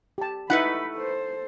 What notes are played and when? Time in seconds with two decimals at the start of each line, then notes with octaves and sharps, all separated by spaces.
0.18 G4 A5
0.50 A3 D#4 E4 B4 F#5 B5 F#6
0.95 A4 C5